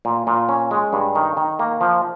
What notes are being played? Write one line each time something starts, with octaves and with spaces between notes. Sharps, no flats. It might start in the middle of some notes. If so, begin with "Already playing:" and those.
A#2
A#2
C#4
G#3
G2
D#3
D#3
A#3
F3